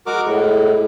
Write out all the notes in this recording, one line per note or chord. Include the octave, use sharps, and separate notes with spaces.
G#3 F#4 A#4 D6
A2 E4